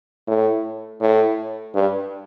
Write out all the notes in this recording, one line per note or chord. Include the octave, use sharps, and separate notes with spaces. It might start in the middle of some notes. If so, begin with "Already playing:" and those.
A2
A2
G2